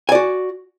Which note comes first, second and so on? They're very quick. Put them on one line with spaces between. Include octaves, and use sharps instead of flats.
G#5 D5 F#4